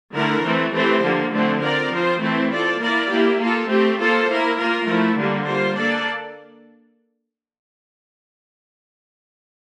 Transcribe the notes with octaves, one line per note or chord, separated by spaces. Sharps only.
D3 A3 E4 A#4
E3 A3 C4
E3 A3 C4 G4 C5
D3 F3 A#3
D3 F3 A3 C4
C4 F4 A#4 D5
F3 C4 F4 C5
E3 A3 C4 E4
C4 F4 A4 D5
A#3 E4 A#4 D5
A#3 E4 G4
A#3 F4 A4
A3 C4 G4
A#3 F4 A4 C5
A#3 E4 A#4
A#3 F4 A#4
F3 A3 E4
D3 G3 A#3
G3 A#3 F4 C5
A#3 D4 A4 D5